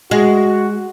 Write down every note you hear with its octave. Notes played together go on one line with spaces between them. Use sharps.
G#3 F#4